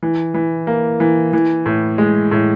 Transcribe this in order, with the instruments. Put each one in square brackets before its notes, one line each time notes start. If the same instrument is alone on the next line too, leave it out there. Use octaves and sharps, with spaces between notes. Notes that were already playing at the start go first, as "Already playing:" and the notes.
[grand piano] E3
E3
A#3
E3
E3
A2
G#3
A2